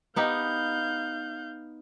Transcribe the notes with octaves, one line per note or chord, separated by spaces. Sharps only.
B3 D#4 G4 F5 G6